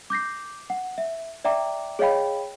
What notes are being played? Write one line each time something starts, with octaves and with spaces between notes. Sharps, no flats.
D6 G6 A#6 C7
F#5
E5
D5 E5 G5 A#5 D6
G#4 C#5 D#5 F5 G5 B5